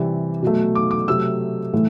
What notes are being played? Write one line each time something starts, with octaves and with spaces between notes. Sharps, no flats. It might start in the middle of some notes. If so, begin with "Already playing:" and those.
Already playing: C3 E3 G3
B2 F#3 A3
D6
D6
C3 F#3 A3 E6
A2 E3 A3